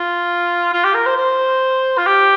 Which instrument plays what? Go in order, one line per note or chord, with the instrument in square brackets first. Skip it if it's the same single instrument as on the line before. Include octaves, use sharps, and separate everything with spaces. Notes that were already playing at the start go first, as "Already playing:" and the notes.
Already playing: [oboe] F4
F4
G4
A#4
C5
C5
F4
G4